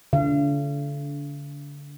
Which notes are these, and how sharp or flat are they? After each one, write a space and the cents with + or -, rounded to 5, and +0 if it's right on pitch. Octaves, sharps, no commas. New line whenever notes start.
D3 -35 F5 -40